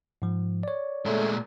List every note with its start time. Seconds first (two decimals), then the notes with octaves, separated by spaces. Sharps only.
0.22 G#2 F3
0.63 C#5 D5
1.06 A#2 G#3 A3